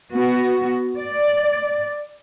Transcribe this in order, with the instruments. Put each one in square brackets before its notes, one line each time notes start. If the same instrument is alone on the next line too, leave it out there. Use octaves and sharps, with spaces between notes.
[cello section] B3 F#4
D5